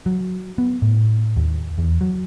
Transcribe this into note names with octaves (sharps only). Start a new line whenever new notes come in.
F#3
B3
A2
D#2
E2
F#3